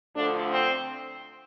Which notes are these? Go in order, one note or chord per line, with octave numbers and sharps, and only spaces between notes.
D2 D3 F3 A3 D4
C4